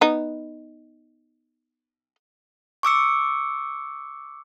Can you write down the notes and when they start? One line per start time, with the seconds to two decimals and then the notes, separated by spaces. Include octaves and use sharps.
0.01 B3 D#4
2.83 C#6 D6 E6 C#7